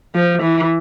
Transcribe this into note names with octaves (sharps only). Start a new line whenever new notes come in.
F3
E3